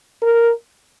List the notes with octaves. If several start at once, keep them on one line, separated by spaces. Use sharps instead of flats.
A#4